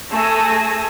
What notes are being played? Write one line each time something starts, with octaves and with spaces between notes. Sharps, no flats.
A3 G#4 A4 G#5 E6 A#6